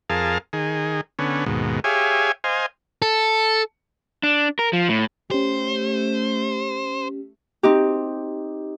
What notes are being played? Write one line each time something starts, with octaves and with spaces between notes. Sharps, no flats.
F2 G#4 A#4 F5 A5
D#3 G#4
D3 B3 C#4
D#2 G#2 B2
G4 G#4 C#5 E5 F5 G#5
C5 D#5 F5 G#5
A4
D4
A#4
F3
A2
A3 C#4 G4 C5
C4 D#4 G4